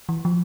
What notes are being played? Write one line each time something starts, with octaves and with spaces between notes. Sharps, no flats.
E3
F3